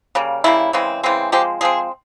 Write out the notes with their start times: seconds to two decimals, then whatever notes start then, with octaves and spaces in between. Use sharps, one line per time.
0.15 C#3 G3 A#3
0.44 C#3 G3 A#3 E4
0.73 C#3 E3 G#3 C4
1.03 C#3 E3 G#3 C4
1.32 F3 G#3 C4 G4
1.61 F3 G#3 C4 G#4